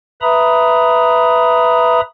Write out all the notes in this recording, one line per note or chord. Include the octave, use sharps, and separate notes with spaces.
B4 E5 A#5 B5 D#6